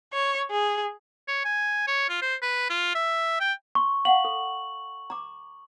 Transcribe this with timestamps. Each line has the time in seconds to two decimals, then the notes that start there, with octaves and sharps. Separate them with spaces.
0.13 C#5
0.51 G#4
1.28 C#5
1.45 G#5
1.87 C#5
2.09 F4
2.22 C5
2.42 B4
2.70 F4
2.95 E5
3.40 G5
3.75 C6 C#6
4.05 F5 F#5 F#7
4.24 A4
5.10 A#5 D6